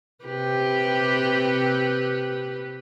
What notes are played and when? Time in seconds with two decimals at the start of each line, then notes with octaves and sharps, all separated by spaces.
0.25 C3 G4 B4